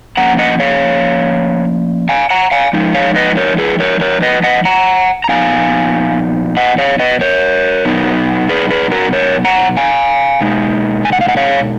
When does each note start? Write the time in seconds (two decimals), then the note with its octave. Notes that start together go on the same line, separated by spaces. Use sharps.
0.17 F3 A#3 C#4 F#5 A#5
0.39 D#5 F#5
0.60 C#5 F5
2.09 F5 G#5
2.30 F#5 A#5
2.51 F5 G#5
2.73 F3 G#3 D#4
2.94 C#5 F5
3.16 B4 D#5
3.37 A#4 C#5
3.58 G#4 B4
3.80 A#4 C#5
4.01 A#4 C#5
4.22 B4 D#5
4.44 D#5 F#5
4.65 F#5 A#5
5.24 A#5
5.29 A#2 F3 B3 D#4 F5 G#5
6.57 D#5 F#5
6.78 C#5 F5
7.00 B4 D#5
7.21 A#4 C#5
7.85 B2 F#3 B3 D#4
8.49 G#4 B4
8.70 G#4 B4
8.91 F#4 A#4
9.13 A#4 C#5
9.45 F#5 A#5
9.77 F5 G#5
10.41 B2 G#3 D#4
11.05 G#5
11.13 F#5
11.21 F5
11.28 D#5 F#5
11.37 C#5 F5